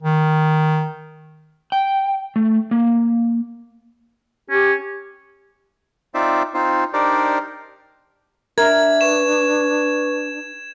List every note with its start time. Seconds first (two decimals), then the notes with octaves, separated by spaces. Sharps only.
0.03 D#3
1.72 G5
2.36 A3
2.71 A#3
4.50 C#4 G4
6.14 C4 D#4 F4 C5 D5 E5
6.54 C4 D#4 F4 C5
6.93 D4 D#4 G4 A#4 C5 D5
8.58 D4 A#4 E5 G#6
9.01 B4 C#6 E7